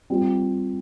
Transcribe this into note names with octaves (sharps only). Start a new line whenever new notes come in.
G3 C4 F4